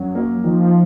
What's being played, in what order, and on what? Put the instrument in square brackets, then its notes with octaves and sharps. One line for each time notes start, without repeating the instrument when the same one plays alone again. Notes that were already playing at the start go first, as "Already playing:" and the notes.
Already playing: [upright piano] F#2 [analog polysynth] F#3
[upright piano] A#3
[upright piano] D#3 [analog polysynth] F3